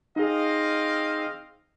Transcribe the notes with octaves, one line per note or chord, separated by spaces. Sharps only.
C4 D#4 G#4 D#5 F5